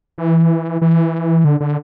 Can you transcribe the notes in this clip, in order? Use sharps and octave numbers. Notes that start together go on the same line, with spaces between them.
E3
E3
D3
D3